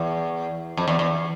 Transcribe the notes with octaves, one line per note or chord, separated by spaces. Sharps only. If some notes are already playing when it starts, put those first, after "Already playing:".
Already playing: E2
F2
E2
E2